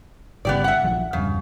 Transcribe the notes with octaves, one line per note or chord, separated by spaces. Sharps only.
G1 C#3 B3 G4 D5
E5 F#5
A#1 F3 F#3
E1 G2 C#3